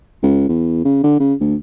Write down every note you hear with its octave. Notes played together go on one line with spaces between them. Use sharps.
C#2
E2
C#3
D3
C#3
D2